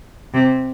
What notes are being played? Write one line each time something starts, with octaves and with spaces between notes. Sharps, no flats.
C3